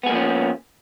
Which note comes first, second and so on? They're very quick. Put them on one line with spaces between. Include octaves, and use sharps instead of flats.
B3 G#4 A#3 F3 C#4